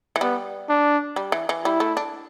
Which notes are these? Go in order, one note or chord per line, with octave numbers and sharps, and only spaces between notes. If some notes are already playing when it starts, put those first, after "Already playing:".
E3
G3 B3
D4
G3
E3
E3
G3 E4
A3
D4